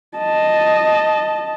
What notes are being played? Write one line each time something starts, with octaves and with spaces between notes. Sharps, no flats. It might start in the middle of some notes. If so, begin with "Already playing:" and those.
D#5 A5